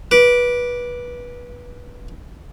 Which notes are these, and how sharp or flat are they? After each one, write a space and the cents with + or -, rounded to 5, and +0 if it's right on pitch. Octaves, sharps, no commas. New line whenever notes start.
B4 -20 D6 +0